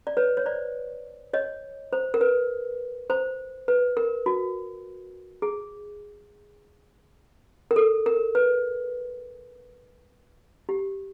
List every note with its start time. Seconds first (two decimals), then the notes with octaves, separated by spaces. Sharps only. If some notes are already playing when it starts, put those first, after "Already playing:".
0.07 D5
0.17 B4 C#5
0.37 C#5
0.46 C5 D5
1.33 C#5 D#5
1.93 C5
2.14 A#4
2.21 B4
3.10 C5
3.68 B4
3.97 A#4
4.26 F#4
5.42 G#4
7.71 A#4
7.76 A4
8.06 A#4
8.35 B4
10.69 G4